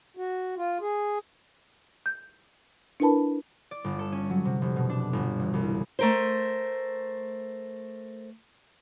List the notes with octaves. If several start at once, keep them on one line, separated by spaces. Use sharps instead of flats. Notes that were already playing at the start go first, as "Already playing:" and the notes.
F#4
F4
G#4
G6
D4 E4 A#4 B4 A5 B5
D5
G1
A4
C#4
F#3
C3
F1
B2
D4
G1
E1
C2
A3 A#4 C5